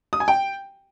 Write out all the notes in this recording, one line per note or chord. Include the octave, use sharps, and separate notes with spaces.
D#6
G#5
G5